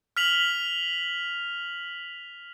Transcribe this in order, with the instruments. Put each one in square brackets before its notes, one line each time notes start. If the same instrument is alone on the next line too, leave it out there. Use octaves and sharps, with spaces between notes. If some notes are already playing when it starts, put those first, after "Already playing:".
[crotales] F6 B6 F7 F#7